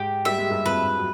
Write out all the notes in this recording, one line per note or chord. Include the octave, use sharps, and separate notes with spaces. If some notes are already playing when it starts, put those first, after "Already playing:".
Already playing: G#2 G#3 G4
G3 E5
G#3
G2 G3
F2 F3 B4
F#3